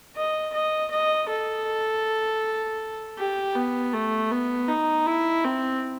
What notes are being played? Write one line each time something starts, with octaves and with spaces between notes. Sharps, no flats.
D#5
D#5
D#5
A4
G4
B3
A3
B3
D#4
E4
C4